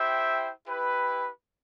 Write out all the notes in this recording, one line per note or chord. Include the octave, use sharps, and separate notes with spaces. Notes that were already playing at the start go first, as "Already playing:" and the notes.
Already playing: E4 G4 C5 E5 G5
E4 G4 B4